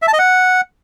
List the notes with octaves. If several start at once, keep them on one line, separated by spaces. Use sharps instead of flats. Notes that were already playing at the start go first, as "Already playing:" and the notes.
E5
A5
D#5
F#5